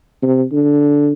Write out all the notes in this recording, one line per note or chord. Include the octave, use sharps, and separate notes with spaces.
C3
D3